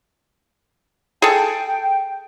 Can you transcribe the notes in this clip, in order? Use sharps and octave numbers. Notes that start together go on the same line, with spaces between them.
G#4 A4 G5